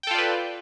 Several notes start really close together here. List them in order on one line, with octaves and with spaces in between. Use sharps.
G5 A4 F4 D5 B4